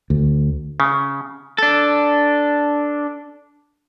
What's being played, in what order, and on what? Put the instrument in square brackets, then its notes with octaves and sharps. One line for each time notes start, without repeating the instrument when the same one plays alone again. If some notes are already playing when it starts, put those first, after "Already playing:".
[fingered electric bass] D2
[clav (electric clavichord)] C#3
[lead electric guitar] D4 A4